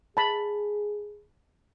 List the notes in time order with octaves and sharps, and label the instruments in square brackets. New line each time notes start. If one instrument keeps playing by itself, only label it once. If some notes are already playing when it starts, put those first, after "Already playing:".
[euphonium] G#4 [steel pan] A5 B5